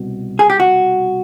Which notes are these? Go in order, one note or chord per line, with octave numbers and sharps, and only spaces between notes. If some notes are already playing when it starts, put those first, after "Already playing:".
Already playing: C2 B2
G#4
G4
F#4